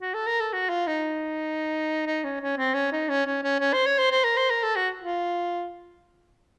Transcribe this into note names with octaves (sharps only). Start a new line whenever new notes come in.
F#4
A4
A#4
A4
F#4
F4
D#4
D#4
C#4
C#4
C4
C#4
D#4
C#4
C#4
C#4
C#4
C5
C#5
C5
C5
A#4
C5
A#4
A4
F#4
F4